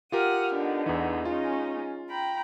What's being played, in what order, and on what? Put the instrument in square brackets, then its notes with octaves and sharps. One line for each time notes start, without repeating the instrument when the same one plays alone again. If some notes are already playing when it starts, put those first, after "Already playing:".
[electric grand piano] F4 G4 A#4 [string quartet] F#5 D#6 F6
[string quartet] D3 B3 D#4
[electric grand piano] E2 E3
[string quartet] G#3 C#4 D#4 [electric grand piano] F4
[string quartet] G5 A#5 B5